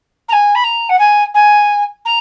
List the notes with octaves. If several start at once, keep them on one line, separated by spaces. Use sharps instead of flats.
A#5
G#5
B5
A#5
F#5
G#5
G#5
A#5